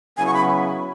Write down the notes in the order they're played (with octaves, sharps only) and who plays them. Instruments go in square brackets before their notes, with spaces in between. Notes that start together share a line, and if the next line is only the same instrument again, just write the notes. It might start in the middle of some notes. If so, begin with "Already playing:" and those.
[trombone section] C#3 F#3 B3 E4 [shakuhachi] G#5
[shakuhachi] C#6
B5